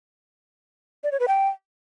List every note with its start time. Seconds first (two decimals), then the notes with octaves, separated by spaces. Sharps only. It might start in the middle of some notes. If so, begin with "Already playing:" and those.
1.04 D5
1.12 C#5
1.20 B4
1.28 G5